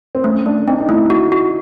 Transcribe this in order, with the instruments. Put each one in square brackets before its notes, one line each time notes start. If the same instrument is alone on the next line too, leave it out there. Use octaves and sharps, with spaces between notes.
[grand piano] C4
[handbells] A3 [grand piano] C#4
[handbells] A3 [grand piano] D4
[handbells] C4 [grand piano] D#4
[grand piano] D#4
[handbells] A3 [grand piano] E4
[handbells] F#4
F#4